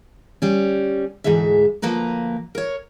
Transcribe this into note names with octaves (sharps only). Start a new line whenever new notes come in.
G3 C#4
D2 G#2 E3 G#3 E5
D2 F3 A#3 B4 A#5
A#4 C#5